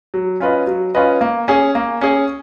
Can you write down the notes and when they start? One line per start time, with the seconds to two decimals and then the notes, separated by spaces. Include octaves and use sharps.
0.14 F#3
0.40 C#4 F4 B4 D#5
0.67 F#3
0.95 C#4 F4 B4 D#5
1.21 A#3
1.48 C#4 G#4
1.75 A#3
2.01 C#4 G#4